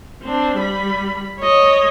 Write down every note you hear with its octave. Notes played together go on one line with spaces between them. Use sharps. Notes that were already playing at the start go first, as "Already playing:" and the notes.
C4 D4
G3 B5
C#5 D#5